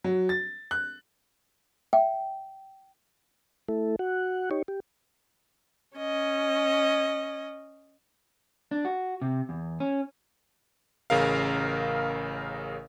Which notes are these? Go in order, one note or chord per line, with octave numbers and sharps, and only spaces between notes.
F#3
A6
F#6
E5 G5
A3 E4 A4
F#4 F#5
D#4 G4 C#5
G4
C#4 D#5
D4
F#4
C3
E2
C#4
A1 C#3 A#4 F5